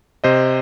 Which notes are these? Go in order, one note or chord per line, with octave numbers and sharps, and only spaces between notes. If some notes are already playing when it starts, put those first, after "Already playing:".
C3 C5 D#5